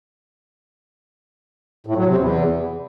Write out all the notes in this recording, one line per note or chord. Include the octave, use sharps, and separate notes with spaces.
A2
F#3
C3
E2